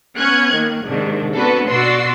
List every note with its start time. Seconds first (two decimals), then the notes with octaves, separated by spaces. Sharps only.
0.18 B3 C#4 F#6 G#6
0.54 D#3 A#3
0.85 G#2 C3 D#3 D4
1.34 B3 C4 D4 F#4 A4 B4
1.69 B2 F#4 D5 C6 E6 C7